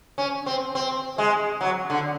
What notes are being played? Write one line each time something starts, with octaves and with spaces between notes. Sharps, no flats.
C#4
C4
C4
G#3
F#3
D3